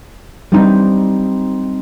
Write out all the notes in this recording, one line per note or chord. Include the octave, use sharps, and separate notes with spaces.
G3 C4 D#4